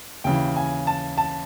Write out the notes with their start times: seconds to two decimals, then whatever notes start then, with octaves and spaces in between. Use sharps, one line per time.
0.24 D#2 C#3 E3 G5
0.56 G#5
0.87 A5
1.18 A5